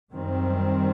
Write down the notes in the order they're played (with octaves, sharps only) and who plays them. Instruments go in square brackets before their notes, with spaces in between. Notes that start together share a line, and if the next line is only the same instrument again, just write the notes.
[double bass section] F#2 D#3 G3 C4